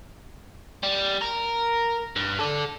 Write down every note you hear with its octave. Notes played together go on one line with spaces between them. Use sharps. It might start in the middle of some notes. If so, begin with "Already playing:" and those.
G3
A#4
G2
A4 D5